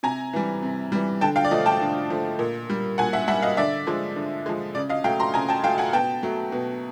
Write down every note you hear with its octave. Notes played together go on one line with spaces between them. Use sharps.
C3 G#5 A#5
E3 G3
C3
E3 G3
D3 G5 A5
F5 G5
D5
F3 A3 D#5
G5 A5
D3
F3 A3
A#2
G3
A#2 F#5 G#5
E5 F#5
G3 E5 F#5
D#5 F5
D3 D5 E5
F3 G#3
D3
F3 G#3
C#3 D5
D#5 F5
F#3 A3 F5 G5
A#5 C6
C#3 G#5 A#5
G5 A5
F#3 A3 F5 G5
F#5 G#5
B2 G5 A5
F#3 A3
B2